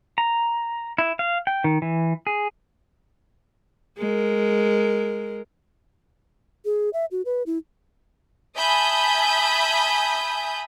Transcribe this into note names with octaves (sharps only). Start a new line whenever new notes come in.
A#5
E4
F5
G5
D#3
E3
G#4
G#3 A#4
G#4
E5
F#4
B4
E4
E5 G#5 A5 B5 D#6 G6